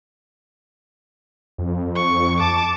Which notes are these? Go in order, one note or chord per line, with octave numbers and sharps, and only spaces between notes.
F2
C#6
A5 D6